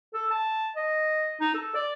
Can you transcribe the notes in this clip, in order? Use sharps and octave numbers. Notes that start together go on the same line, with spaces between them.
A4
A5
D#5
D#4
A4
D5